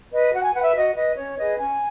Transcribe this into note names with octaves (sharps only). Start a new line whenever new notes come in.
B4 D#5
F#4 F#5
G#5
B4 F#5
E5
F#4 D#5
B4 D#5
C#4 C#5
G#4 B4 D#5
C#4 G#5